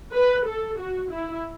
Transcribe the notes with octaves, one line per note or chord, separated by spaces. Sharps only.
B4
A4
F#4
E4